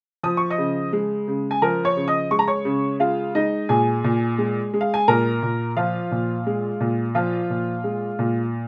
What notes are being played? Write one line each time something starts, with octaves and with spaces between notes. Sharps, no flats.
F3 D#6
C#6
D#5 D#6
C#3
G#3
C#3
G#5
F3 A#4 A#5
C#5 C#6
C#3
D#5 D#6
G#3 C#6
A#5
C#5 C#6
C#3
G#3 F4 F5
G#3 D#4 D#5
A#2 G#4 G#5
A#2
G#3
G#3
F5
G#5
A#2 A#4 A#5
A#2
F3 F4 F5
A#2
G#3
A#2
F3 F4 F5
A#2
G#3
A#2